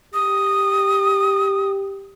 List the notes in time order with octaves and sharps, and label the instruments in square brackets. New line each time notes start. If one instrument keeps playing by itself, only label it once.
[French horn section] G4 [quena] D#6